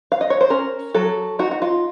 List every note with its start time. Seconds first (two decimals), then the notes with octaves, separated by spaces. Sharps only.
0.12 F5
0.21 D#5
0.30 C#5
0.41 C5
0.50 C#4 A#4
0.95 F#3 A4
1.39 D#4 F#4
1.51 F#4
1.62 F4